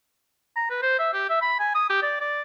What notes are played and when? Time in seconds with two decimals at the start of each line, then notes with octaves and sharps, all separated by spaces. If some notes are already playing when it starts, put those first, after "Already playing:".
0.56 A#5
0.70 B4
0.82 C5
0.99 E5
1.14 G4
1.30 E5
1.41 B5
1.59 G#5
1.75 D#6
1.90 G4
2.02 D5
2.21 D5